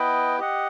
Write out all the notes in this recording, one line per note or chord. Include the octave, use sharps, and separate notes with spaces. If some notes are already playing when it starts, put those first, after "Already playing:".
Already playing: B3 E4 B4 D#5 G5
G4 D#5 F#5